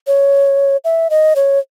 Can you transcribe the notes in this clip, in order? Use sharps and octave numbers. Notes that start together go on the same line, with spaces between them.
C#5
E5
D#5
C#5